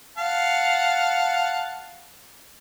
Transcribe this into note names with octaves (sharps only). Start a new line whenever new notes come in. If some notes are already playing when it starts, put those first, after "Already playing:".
F5 F#5 A5